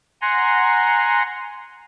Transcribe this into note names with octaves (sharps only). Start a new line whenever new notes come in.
F#5 G#5 A#5 C6